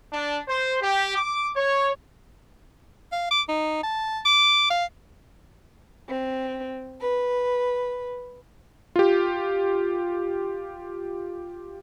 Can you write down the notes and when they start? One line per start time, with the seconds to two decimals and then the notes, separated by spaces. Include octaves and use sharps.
0.13 D4
0.48 C5
0.81 G4
1.16 D6
1.56 C#5
3.12 F5
3.31 D6
3.49 D#4
3.83 A5
4.25 D6
4.70 F5
6.08 C4
7.01 B4
8.96 F4 G4